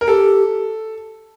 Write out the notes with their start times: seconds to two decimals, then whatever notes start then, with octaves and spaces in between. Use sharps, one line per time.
0.01 A#4
0.07 G4 A4